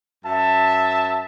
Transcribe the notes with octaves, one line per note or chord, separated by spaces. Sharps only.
F#2 E5 A5